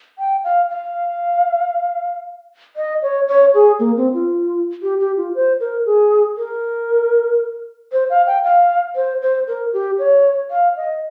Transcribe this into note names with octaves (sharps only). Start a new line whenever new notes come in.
G5
F5
F5
D#5
C#5
C#5
G#4
A#3
C4
F4
G4
G4
F4
C5
A#4
G#4
A#4
C5
F5
G5
F5
C5
C5
A#4
G4
C#5
F5
D#5